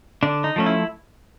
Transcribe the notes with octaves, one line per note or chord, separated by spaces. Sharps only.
D3 D4
D#4
F3 A3 C#4
E4